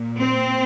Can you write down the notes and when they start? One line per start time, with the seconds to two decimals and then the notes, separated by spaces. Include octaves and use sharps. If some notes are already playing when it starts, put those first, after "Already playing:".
Already playing: A#2
0.20 C4